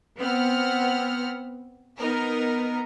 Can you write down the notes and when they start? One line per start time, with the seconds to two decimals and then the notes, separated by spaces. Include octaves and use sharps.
0.18 B3 C4 F#5 F6
1.97 B3 D#4 A#4